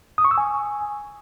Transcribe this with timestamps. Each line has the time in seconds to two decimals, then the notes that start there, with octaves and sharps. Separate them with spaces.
0.18 D#6
0.25 C#6
0.31 E6
0.38 G#5